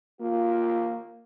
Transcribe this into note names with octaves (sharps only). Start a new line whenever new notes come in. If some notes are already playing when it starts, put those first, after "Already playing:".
A#3 F4